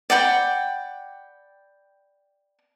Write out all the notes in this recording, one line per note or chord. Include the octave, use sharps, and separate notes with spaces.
D5 F#5 G5 B5